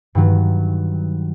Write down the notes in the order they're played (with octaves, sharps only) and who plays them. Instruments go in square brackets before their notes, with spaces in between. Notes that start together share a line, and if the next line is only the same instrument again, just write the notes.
[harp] G2 D#3 F#3